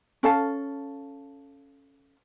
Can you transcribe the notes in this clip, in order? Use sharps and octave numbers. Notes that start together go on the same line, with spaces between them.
C#4 A4 F5 A5